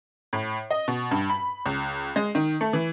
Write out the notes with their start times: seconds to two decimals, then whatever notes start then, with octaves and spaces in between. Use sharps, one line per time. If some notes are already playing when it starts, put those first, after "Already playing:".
0.33 A2
0.71 D#5
0.88 B2
1.11 G2
1.30 B5
1.66 C#2
2.16 G#3
2.35 D#3
2.61 A3
2.73 E3